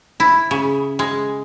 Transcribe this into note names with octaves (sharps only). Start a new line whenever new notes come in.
E4
C#3
G#3